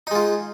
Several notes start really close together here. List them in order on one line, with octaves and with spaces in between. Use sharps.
D#4 G#3 F4